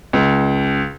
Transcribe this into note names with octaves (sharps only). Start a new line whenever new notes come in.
C#2